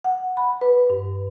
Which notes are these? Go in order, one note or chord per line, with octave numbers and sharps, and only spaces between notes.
F#5
B5
B4
G2